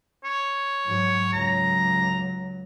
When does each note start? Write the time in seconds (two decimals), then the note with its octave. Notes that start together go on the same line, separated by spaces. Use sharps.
0.24 C#5
0.86 G#2 F#3
1.33 C#2 F#3 A#5